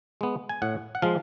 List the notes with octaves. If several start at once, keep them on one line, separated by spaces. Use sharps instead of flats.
G#3 B3
G#5
A2 F#5
F#5
F3 G#3 F5